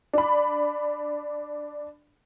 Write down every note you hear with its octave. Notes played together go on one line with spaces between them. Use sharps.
D4 B5